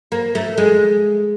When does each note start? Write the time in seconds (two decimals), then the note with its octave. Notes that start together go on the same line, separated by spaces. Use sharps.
0.12 A#3
0.35 A3
0.57 G#3